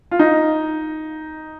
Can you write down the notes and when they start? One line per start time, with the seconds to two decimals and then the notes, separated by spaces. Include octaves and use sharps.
0.11 F4
0.19 D#4